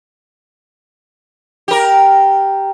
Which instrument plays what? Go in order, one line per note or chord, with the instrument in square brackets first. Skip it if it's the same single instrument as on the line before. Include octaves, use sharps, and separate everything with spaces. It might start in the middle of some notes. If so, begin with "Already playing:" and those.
[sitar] G4 A#4